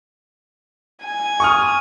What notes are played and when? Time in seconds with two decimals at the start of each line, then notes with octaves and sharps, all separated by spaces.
1.03 G#5
1.40 C#6 D#6 F6